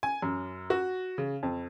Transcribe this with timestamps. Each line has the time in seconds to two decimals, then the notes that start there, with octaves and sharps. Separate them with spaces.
0.03 G#5
0.22 F#2
0.70 F#4
1.18 C#3
1.43 F2